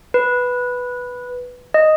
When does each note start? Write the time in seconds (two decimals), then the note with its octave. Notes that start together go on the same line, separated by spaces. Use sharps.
0.14 B4
1.74 D#5